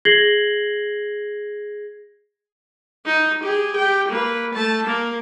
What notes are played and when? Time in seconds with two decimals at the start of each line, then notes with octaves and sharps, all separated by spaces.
0.05 G#4 G#6 A#6 C7 F#7 G7
3.06 D#4
3.43 G4 G#4
3.76 G4 G5
4.08 A#3 B4
4.54 A3 A5
4.86 A#3 A#4